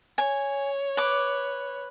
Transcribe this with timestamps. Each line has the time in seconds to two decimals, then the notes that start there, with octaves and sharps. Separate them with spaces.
0.18 C#5 G#5
0.97 B4 D6